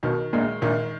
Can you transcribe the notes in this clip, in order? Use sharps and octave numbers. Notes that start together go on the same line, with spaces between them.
B1 B2 D#3
A#1 A#2 G#3
A#1 A#2 D#3